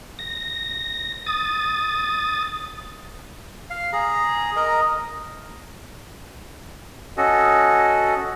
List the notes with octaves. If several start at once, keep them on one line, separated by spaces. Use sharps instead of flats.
A#6
D#6 A6
F5
G#4 A#5
A#4 D#5 A#5
C#4 F#4 A4 D#5